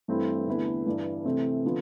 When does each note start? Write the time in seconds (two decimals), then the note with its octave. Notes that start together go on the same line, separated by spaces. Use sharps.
0.08 G2 E3 A3 C4 E4
0.47 E2 D3 A3 E4 B4
0.86 G2 E3 G3 D4
1.25 C3 E3 A3 C4
1.65 D3 F3 B3